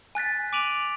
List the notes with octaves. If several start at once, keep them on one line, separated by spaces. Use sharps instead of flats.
G#5 F#6 A6 B6
D6 D7 D#7 F7 F#7